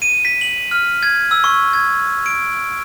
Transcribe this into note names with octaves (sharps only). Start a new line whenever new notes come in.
D#7
B6
F#7
F6
G#6
E6
C#6
G#6
D7